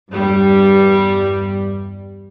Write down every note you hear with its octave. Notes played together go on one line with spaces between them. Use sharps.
E2 G2 G3